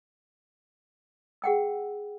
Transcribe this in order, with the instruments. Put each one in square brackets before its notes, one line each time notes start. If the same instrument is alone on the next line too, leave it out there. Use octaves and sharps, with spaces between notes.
[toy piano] G#4 F#5 G5 E6